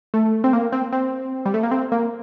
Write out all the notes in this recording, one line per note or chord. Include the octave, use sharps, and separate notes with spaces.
A3
C4
A#3
C4
C4
G3
A3
A#3
C4
A#3